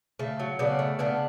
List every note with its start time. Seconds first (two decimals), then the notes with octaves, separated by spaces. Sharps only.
0.19 C#3 A3
0.40 F#3
0.59 C#3 B3 D4
0.79 A3
0.99 C#3 B3 D4